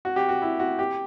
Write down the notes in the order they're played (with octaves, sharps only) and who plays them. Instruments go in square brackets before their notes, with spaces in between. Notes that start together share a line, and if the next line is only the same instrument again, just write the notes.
[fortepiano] F#4
G4
F#4
E4
F#4
G4